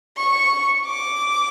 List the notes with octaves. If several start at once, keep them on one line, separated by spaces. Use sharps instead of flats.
C#6
D6